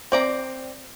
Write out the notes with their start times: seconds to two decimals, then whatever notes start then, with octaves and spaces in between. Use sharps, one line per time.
0.12 C4 D5 A#5